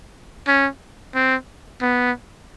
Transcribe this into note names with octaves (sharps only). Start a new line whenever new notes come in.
C#4
C4
B3